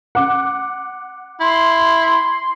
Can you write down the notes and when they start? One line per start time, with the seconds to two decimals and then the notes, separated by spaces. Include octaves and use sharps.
0.15 F#5 D6
1.40 E4 C6